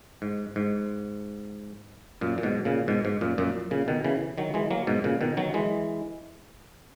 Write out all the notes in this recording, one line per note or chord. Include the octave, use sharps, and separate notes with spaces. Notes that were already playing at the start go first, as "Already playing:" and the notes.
G#2
G#2
F#2 A#2
A#2
G#2 B2
A#2 C#3
G#2 B2
G#2
F#2 A#2
F#2 A#2
A#2 C#3
B2 D#3
C#3 E3
D#3 F#3
E3 G#3
F#3 A#3
G#2 B2
A#2 C#3
B2 D#3
D#3 F#3
E3 G#3